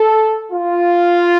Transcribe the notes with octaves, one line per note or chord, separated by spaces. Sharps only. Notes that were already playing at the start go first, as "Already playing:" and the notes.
Already playing: A4
F4